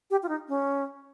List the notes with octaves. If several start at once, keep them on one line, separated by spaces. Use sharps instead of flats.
G4
F4
D#4
C#4